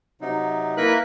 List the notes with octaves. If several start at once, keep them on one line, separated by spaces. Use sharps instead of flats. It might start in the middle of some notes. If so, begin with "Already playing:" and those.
C3 F#3 D#4
A#3 E4 A#4 B4 B5 F#6